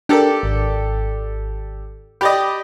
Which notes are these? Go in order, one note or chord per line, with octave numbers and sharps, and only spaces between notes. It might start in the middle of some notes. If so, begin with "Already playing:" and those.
D4 G4 A4 A#4 D5
G#1
G4 D5 D#5 B5